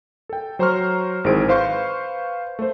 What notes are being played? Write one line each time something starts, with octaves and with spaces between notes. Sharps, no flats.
A4 G5
F#3 C5 A#5 C6 C#6 F6
G#1 D#3 E3 G#4 C5 D7
B4 C5 F5 C6 C#6 G6
A3 C5